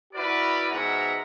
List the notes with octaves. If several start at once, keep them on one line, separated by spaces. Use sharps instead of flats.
E4 F#4 A#4 B4 D5
G#2 B2 E5 F#5 A#5